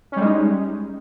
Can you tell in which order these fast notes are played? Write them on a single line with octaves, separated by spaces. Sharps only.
C#4 G3 G#3 D#4